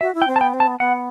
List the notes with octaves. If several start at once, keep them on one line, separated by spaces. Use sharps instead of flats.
F#4 E5
E4
G5
C4
A5
B3 G5
C4
A5
B3
B3 F#5